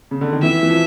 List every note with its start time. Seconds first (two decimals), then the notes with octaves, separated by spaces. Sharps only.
0.11 C#3
0.21 D3
0.32 D#3
0.43 E3 E5
0.63 E3
0.70 F3